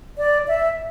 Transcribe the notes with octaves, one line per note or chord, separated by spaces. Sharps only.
D5
E5